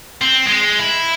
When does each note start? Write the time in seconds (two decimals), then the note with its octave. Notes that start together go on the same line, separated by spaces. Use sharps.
0.21 C4
0.46 G#3
0.79 E4